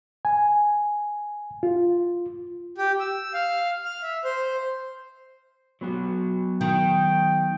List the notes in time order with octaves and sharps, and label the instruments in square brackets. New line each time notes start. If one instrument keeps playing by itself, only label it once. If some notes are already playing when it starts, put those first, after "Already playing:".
[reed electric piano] G#5
F4
[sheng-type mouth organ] G4
E6
F5
F6
E5
C5
[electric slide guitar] F#3 B3 F#4
[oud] D#3 [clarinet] G5